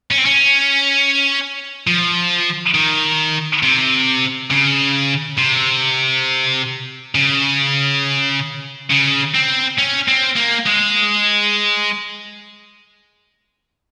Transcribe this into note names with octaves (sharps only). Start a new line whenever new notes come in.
C#4
C4
C#4
F3
D#3
C3
C#3
C3
C#3
C#3
C4
C#4
C4
A#3
G#3